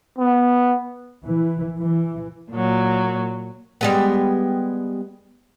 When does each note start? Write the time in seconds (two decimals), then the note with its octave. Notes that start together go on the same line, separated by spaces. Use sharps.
0.18 B3
1.25 E3
1.82 E3
2.52 A#2 F#3
3.81 G3 G#3 B3